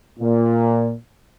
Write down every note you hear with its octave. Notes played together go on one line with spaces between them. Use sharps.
A#2